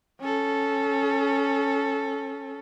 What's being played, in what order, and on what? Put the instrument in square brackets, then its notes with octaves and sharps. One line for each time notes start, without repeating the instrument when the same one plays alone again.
[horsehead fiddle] C#4 A4